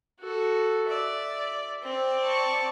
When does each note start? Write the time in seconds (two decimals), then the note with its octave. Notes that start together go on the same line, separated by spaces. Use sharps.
0.21 F#4 A4
0.89 D5 E5
1.83 C4 D5
2.20 A5 C#6